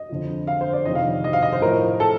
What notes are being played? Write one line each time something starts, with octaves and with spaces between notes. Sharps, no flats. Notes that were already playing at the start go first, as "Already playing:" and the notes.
Already playing: D#5
F2 D3 F3
F5
C5
D5
F2 C3 D#3 D#5
F5
D#5
F5
D#5
C5
A2 F3 A#4
A4